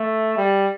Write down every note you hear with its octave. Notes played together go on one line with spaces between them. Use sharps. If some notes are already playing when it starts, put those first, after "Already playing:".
Already playing: A3
G3